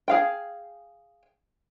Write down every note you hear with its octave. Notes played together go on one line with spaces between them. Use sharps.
G#4 F5 G5